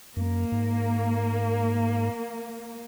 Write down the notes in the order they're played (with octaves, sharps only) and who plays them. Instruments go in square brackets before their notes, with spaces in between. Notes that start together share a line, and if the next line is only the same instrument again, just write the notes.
[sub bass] F#2 [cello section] A#3
[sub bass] G#2